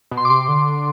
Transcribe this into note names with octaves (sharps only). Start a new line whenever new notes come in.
B2
C6
D6
C3 C6
D3